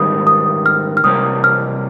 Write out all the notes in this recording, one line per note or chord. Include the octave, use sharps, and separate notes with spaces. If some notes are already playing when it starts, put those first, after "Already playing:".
Already playing: G#2 D#3 G3 A#3 D#6
D#6
F6
F6
C3 G3 A#3 D#6
F6